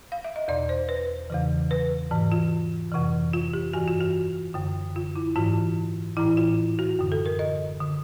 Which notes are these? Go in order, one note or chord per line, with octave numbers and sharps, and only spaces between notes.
F5
E5
D#5
E2 B2 D5
C5
B4
E2 C#3 E3
B4
G#2 E3
F4
F2 C3 E3
F4
G4
G2 E3 F#4
F4
F#4
F#2 D3
F4
E4
G#2 E3 F4
A2 E3 E4
F4
F#4
F#2 D3
A4
A#4
D#5
D3